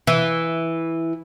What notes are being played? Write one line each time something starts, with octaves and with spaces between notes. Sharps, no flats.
E3